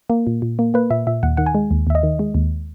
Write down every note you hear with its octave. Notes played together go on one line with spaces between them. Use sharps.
A#3
A#2
A#2
A#3
A#3 B4
A#2 E5
A#2 E5
D#2 F#5
D#3 F#5
G#5
G#3
D#2
D#2 E5
D#5
D#3
G#3
D#2